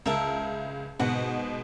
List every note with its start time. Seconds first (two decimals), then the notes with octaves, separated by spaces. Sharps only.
0.06 C#2 A#4 E5 A5
1.00 G#2 B2 F#4 F#5